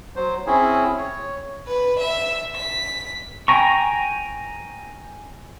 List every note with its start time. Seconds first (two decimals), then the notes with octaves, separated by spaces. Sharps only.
0.16 F#3 C5
0.47 C4 C#4 E4 G#4
0.97 C#5
1.67 B4
2.00 E5
2.56 B6
3.48 G5 G#5 A#5 C#6